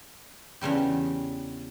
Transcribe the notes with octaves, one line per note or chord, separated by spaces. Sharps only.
E2 C#3 G3 D4 G4